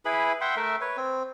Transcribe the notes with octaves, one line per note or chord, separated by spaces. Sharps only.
E4 G#4 B4 B5
E5 F#5 G5 C6
A3 A#4 E5
B4 C#5
C4